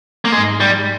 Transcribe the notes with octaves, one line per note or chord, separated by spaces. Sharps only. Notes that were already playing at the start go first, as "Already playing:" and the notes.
A#3
G#2 G#3
G3